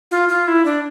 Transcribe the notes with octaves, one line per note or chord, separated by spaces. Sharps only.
F4
F4
E4
D4